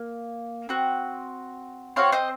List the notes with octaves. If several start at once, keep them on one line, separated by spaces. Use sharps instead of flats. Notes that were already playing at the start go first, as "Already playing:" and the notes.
Already playing: A#3
C4 F#4
C4 F#4 C#5 F5
C5 D#5